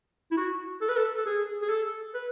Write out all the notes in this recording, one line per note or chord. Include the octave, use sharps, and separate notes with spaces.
E4
F#4
A4
B4
A4
A4
G#4
G#4
A4
B4